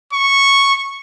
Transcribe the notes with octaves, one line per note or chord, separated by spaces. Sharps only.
C#6